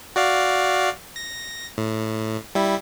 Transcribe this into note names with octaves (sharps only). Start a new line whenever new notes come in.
F#4 D5 F5
A#6
A2
G3 E4